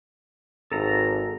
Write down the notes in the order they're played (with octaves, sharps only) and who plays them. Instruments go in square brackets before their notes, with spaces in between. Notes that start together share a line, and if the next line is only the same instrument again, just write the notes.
[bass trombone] G#1 [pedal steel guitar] A4 A#5